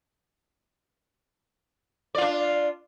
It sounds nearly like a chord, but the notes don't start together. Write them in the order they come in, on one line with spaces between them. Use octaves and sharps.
D5 F4 D4